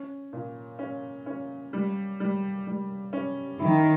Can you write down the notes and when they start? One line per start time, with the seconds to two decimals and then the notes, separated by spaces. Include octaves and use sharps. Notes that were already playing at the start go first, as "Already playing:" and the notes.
Already playing: C#4
0.33 A#2
0.79 C#4
1.26 C#4
1.73 G3
2.20 G3
2.67 G3
3.13 C#4
3.59 D#3 E4